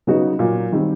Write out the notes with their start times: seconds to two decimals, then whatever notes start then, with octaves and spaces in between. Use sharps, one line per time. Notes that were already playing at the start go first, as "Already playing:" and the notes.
0.07 C#3 F#3 B3 D#4 F#4
0.39 A#2 F#3 A#3
0.72 D#3 G3 C4